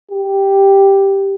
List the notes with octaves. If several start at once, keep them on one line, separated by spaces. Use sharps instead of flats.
G4